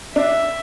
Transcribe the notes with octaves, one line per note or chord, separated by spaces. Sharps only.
D4 E5